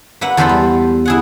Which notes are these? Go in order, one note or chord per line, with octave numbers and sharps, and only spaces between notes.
A#3 B4 E5 F#5
E2 A4 B4 C5 B5 C6
G3
E4 G#4 F#5